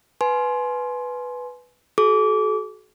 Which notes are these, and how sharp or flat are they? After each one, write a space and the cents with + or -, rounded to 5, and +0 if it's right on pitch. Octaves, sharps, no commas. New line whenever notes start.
B4 +0 G#5 +30 C6 +5
F#4 +15 A4 -45 D6 -25